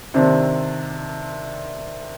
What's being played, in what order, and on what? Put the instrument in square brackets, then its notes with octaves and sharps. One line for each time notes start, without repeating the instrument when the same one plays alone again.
[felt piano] C3 D#3 C4 D4